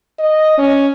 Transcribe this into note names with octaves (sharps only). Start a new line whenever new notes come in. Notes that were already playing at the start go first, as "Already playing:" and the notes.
D#5
C#4